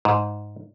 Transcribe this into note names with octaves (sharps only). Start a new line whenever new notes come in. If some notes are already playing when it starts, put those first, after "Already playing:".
G#2